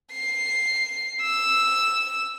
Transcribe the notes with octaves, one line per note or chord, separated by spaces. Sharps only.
C7
E6